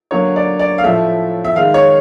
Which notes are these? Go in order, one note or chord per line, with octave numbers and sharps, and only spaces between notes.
D3 F#3 A#3 C#5
D5
D5
F5
A2 F3 A3 E5
E5
D#3 G#3 F5
C#5